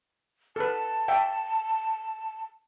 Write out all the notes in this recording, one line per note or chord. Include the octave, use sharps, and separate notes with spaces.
A4 B4 A5
E5 G5